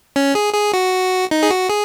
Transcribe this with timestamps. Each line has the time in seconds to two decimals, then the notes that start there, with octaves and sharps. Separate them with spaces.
0.16 C#4
0.35 G#4
0.54 G#4
0.73 F#4
1.31 D#4
1.43 G#4
1.50 F#4
1.70 G#4